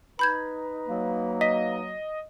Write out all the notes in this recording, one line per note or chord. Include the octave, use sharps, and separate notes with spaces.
D#4 B4 A#5 B5 G6 G#6
F#3 A#3
D#5 B6